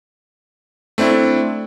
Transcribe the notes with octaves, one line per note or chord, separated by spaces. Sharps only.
A3 C4 D4 E4